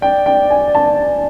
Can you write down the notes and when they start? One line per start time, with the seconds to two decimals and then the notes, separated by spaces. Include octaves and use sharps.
0.02 D5 G5
0.26 G5
0.50 G#5
0.75 A5